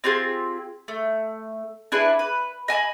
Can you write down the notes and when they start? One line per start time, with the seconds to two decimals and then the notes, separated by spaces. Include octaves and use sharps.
0.04 C4 F4 G4 G#4
0.88 A3
1.92 D4 E4 G#4 B4
2.19 B4
2.68 D#5 G#5 A5 B5